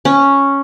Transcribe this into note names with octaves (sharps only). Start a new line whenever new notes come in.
C#4